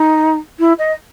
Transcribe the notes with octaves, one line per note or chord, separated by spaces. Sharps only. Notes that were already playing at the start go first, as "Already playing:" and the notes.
Already playing: D#4
E4
D#5